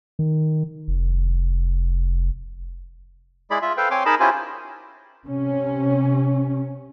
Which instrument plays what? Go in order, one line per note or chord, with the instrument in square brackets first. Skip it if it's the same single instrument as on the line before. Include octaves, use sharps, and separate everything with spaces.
[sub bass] D#3
F1
[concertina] G#3 E4 G#4 D5 B5
F4 E5
A4 B4 C5 F5 G5
C4 C#5 G5 G#5 C6 D6
D#4 G#4 A#4 D#5 A5 B5
C#4 E4 F4 G4 C5 G#5
[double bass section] C3 C#4